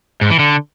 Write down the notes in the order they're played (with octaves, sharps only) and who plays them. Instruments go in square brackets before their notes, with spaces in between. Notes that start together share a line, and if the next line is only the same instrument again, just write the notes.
[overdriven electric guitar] G#2
E3
D3